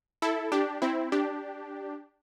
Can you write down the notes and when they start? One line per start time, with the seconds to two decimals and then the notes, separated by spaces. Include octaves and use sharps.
0.22 E4 A4
0.52 D4 G4
0.82 C4 E4
1.12 D4 G4